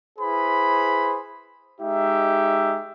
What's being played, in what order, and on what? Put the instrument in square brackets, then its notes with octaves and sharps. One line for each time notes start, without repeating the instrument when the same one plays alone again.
[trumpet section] E4 G#4 B4 C5 B5
G#3 D#4 G4 E5